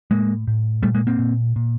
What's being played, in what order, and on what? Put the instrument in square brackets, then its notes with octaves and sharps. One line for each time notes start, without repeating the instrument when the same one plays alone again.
[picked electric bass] A2 G#3 A#3
A2
A#2 G3 A3
G#3 A#3
A#3 C4
A#2
A#2